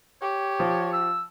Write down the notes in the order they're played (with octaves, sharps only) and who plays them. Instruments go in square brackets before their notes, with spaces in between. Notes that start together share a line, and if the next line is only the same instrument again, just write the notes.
[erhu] G4 [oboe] C#5
[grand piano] F3
[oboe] E6